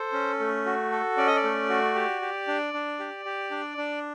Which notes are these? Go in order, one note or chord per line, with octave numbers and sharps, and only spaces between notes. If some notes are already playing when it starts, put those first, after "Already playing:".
Already playing: A4 C5
C#4
A3
F#4
A4
C#4 D5
D#5
D5
A3
F#4
G4
G4
D4
D4
G4
G4
D4
D4